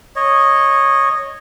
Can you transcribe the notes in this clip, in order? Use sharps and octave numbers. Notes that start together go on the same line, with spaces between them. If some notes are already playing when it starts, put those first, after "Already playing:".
C#5 D#5